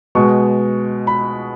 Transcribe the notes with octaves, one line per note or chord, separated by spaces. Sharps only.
B2 G#3 C#6
B5